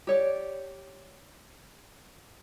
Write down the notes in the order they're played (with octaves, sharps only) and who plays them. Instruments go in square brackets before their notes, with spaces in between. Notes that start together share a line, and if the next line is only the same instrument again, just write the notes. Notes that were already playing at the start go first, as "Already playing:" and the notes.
[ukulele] G4 C#5 D5